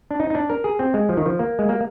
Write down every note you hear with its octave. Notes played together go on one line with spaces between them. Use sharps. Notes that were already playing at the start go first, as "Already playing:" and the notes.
D4
D#4
D#4
D4
A#4
G#4
C4
G#3
F3
D#3
F3
A#3
G#3
A#3